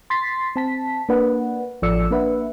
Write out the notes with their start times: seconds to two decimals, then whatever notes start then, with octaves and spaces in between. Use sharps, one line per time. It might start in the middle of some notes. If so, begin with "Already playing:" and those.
0.10 C6 A6 B6 C7
0.56 C4 A5 B6
1.09 A#3 D4 B4 F#5
1.82 A1 F3 A4 D5 E6 C#7
2.11 A#3 D4 B4 E5 F#5